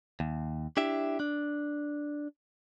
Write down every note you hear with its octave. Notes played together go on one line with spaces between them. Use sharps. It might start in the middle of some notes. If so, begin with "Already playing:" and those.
D#2
D4 E4 G4 E5
D4